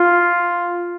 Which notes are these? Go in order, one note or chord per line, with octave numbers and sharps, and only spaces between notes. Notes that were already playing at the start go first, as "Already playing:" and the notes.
Already playing: F4